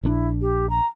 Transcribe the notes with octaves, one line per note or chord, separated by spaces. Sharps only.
A#1 C#3 D4 E4
G4
A#5